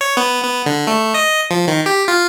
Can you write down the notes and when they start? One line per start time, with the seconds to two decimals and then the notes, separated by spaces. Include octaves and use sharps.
0.01 C#5
0.17 B3
0.43 B3
0.66 D3
0.87 A3
1.14 D#5
1.51 F3
1.68 D#3
1.86 G4
2.08 F4